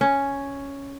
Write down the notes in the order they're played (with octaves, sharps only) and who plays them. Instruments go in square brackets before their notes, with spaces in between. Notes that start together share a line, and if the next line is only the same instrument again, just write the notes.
[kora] C#4